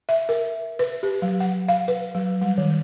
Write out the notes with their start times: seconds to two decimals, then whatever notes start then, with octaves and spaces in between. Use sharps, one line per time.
0.09 E5
0.29 A#4
0.79 B4
1.03 G4
1.22 F#3
1.40 F#5
1.68 F5
1.88 B4
2.15 F#3
2.42 G3
2.58 D#3